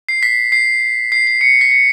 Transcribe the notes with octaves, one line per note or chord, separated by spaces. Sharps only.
C7
B6
C7
C7
C7
C#7
B6
C#7